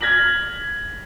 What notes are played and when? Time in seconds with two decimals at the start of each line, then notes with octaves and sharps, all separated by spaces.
0.01 F6 G#6 A#6 B6 F#7